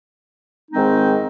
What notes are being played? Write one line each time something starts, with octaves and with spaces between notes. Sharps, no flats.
G#2 D#3 G#3 C4 D#4